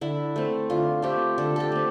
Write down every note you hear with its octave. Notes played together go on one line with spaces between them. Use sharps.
D3 E4
A3 C4
D3 F4
A3 C4 G4
D3 A4
G4 A4
A3 C4